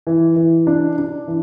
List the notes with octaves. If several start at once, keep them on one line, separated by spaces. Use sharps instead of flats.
E3
E3
D4
D4
E3